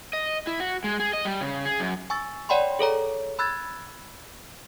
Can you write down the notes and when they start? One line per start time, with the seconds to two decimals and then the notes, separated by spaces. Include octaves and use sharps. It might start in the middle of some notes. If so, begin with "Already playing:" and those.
0.13 D#5
0.47 E4
0.60 F#4
0.84 G#3
1.00 G#4
1.13 D#5
1.25 G3
1.41 C#3
1.65 G#4
1.80 F#2
2.10 G#5 C#6 E6 A6
2.49 C#5 D5 F#5 G5 B5 C6
2.79 G#4 A4 C#5 A#5
3.39 B5 E6 F#6 G#6 A6